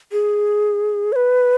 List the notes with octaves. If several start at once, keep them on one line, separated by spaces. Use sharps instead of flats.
G#4
C#5
B4